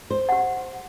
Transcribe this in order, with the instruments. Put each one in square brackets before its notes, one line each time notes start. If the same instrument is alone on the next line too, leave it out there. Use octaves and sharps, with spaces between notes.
[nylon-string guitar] C5
[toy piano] G4 F#5